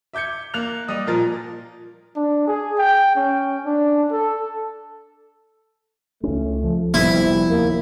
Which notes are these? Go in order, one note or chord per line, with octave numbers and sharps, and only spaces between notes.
E5 D6 G6 G#6 C#7
A#3 F#6 F7
G3 D#5 D#6
A#2 F3 A#4 A6
D4
G#4
G5
C#4
D4
A4
C#2 A3 C#4
F3
F1 C3 G3 B3 E4
D#2 A#3